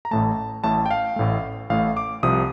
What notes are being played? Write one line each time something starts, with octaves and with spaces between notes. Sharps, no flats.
A#5
A1 A2 A3 A5
A1 A2 A3 A5
G5
F5
A1 A2 A3
A1 A2 A3 F5
D6
C2 C3 F3 D#6